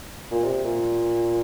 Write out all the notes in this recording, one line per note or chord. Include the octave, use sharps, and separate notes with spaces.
A#2
C3
A#2